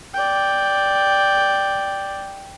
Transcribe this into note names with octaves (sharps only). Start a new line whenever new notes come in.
D5 G5